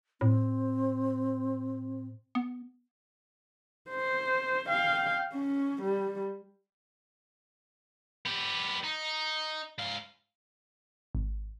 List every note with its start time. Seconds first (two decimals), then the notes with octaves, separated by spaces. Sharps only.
0.21 A2 C4
2.35 B3
3.91 C5
4.69 F5 G5
5.33 C#4
5.82 G3
8.26 B3 G4
8.84 D#4
9.78 G#2 F5
11.15 G#1